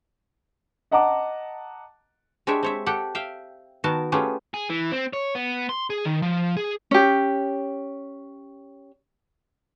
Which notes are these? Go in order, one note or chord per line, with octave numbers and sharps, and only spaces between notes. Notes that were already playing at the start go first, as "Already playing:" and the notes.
D#5 F#5 A5 A#5 D6
G#3 D4 G4 C#5 E5
C4 C#5 E5
G4 A4 F#5 G5
E5 F5 G5
D#3 B3 F#4 A#4 A5
A3 B3 C#4 F4 G4 G#4
G#4
E3
C4
C#5
B3
C6
G#4
D#3
F3
G#4
C#4 G4